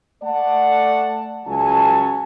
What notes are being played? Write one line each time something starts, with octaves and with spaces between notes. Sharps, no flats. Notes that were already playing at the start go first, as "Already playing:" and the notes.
A3 D5 F#5 A5
C#2 F#3 C#4 G#5 A5